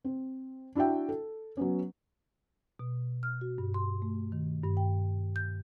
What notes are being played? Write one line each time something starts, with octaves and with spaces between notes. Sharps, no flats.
C4
D4 E4 F#4 E5 G5
A4
F#3 B3 C#4
B2
F6
F#4
G2
C6
A3
D#3
G2
G5
G6